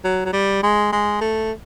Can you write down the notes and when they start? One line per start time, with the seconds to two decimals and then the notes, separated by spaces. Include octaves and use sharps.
0.04 F#3
0.25 F#3
0.33 G3
0.63 G#3
0.92 G#3
1.21 A3